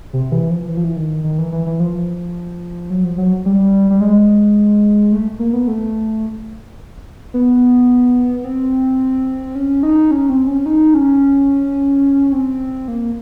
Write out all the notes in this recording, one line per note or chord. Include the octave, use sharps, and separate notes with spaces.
C3
E3
F3
E3
F3
E3
D#3
D#3
E3
E3
E3
F3
F#3
F3
F#3
G3
G3
G#3
A3
A#3
B3
A3
B3
C4
C#4
D#4
C#4
C4
C#4
D#4
C#4
C4
A#3